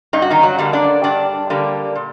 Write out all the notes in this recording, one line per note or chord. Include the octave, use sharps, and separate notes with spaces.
G2 D#4
F#4
D#3 D#4
F#3 F#4
D3 G3 A#3
D4 D5
G2 D4 D5
D3 G3 A#3
A#2